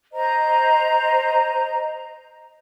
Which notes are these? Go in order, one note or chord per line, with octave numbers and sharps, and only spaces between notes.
C5 D#5 A#5